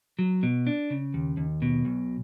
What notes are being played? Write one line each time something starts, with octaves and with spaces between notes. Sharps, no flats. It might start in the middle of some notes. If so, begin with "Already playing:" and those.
F#3
B2
D4
C#3
D#2
D#2
B2
B1